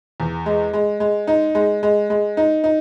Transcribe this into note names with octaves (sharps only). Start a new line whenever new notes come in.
E2
G#3
G#3
G#3
D#4
G#3
G#3
G#3
D#4
D#4